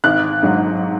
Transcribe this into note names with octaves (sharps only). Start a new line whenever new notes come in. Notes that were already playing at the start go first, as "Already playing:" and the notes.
G#1 F#6
G#2 F#3